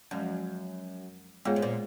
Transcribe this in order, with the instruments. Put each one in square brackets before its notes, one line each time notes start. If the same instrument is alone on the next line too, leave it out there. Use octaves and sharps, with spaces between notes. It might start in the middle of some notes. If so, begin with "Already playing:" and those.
[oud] F#2 [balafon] F3 G#3 C#4
[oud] G#2 [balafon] G#3 B3 F4 G#4 C#5
[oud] G#2
A#2